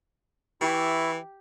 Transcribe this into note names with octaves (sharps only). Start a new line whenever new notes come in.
E3 E4 G4 E5 C#6